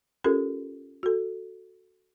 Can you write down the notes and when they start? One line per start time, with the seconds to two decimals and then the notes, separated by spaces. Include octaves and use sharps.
0.24 C#4 F4 G4 A4 A#4
1.03 F#4 A4